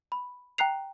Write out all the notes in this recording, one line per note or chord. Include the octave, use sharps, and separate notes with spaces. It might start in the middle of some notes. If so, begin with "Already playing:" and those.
B5
G5 A#5 F#6 C7 F7